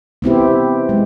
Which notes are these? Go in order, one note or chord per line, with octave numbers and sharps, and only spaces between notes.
B3 C4 E4 G4
G#3